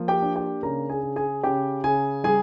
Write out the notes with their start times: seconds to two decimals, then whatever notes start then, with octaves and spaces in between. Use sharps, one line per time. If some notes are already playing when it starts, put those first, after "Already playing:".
Already playing: F3 A#3
0.08 G4 G5
0.22 D4
0.35 G4 G5
0.63 C#3 A#4 A#5
0.90 G#4 G#5
1.02 C#3
1.16 G#4 G#5
1.43 C#3 G4 G5
1.84 C#3 G#4 G#5
2.24 G3 G#4 G#5